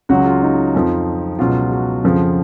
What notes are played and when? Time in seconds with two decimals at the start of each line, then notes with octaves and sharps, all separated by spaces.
0.09 C#2 C#3 F#3 F#4
0.25 F4
0.43 D#4
0.75 F2 F3
1.39 C#2 B2 F#3 F4
1.71 F#4
2.04 F2 C#3 F3